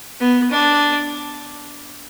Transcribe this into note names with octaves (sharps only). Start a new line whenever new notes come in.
B3
D4